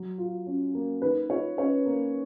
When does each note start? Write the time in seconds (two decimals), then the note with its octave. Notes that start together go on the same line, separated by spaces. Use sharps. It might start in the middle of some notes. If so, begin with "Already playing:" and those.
Already playing: F#3
0.18 F4
0.46 C#4
0.75 A#3
1.02 D#3 B4
1.30 F4 C#5
1.58 C#4 C#5
1.86 A#3